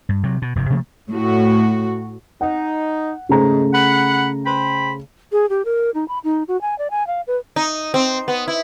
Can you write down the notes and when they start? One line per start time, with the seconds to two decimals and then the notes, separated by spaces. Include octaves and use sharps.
0.09 G2
0.23 C3 F#3
0.42 B2
0.56 F1 G2 C3
0.70 C3 F3 A3 A#3
1.10 A2 F#4
2.41 D#4 F#5
3.29 G#2 C#3 A3 A#5
3.72 F#5 B5
4.45 C5 G5 B5
5.32 G#4
5.49 G4
5.65 A#4
5.94 D#4
6.08 B5
6.24 D#4
6.48 F#4
6.61 G#5
6.78 D5
6.91 G#5
7.07 F5
7.27 B4
7.56 D#4
7.94 C4
8.28 B3
8.48 E4